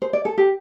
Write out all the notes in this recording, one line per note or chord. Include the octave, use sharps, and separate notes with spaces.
C5
D5
A4
G4